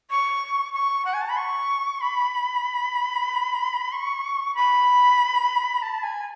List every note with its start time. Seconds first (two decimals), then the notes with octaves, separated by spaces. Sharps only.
0.10 C#6
0.73 C#6
1.05 F#5
1.14 G#5
1.21 A5
1.29 B5
1.37 C#6
2.01 B5
3.92 C#6
4.55 B5
5.82 A5
6.03 G#5